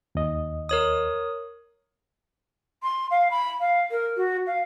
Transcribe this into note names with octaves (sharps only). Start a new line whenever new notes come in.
D#2 D#5
A#4 C#5 D#6
C6
F5
B5
F5
A#4
F#4
F5